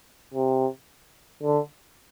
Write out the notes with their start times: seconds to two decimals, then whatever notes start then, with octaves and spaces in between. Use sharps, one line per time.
0.34 C3
1.43 D3